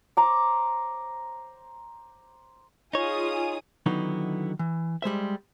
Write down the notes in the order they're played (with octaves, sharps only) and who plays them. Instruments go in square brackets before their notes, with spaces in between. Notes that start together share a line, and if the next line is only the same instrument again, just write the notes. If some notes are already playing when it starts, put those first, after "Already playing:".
[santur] C5 A#5 D6
[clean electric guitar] D#4 C#5 [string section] F4 G#4 D#6
[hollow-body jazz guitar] D3 D#3 F#3 B3 D#4 E4
E3
G3 G#3 C5 E5